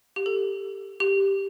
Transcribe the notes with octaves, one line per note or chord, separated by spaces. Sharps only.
G4
A4
G4